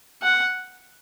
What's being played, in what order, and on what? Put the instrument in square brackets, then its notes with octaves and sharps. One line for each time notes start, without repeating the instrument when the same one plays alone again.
[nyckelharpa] F#5